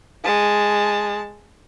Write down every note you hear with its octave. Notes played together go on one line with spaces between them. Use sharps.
G#3 A5